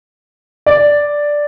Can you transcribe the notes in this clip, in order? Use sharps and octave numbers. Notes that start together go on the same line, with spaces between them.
D5